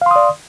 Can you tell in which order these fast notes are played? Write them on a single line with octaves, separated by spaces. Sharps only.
F5 C6 D#6 D5